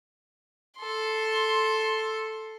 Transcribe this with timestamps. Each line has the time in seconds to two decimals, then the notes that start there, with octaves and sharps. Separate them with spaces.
0.78 A4 C6